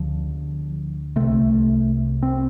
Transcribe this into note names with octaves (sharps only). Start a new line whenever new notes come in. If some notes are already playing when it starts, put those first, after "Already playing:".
Already playing: D2 D3 F3
C2 C3 A3
C4